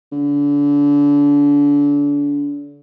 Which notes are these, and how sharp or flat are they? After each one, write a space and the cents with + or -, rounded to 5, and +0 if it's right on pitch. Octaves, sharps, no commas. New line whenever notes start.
D3 -35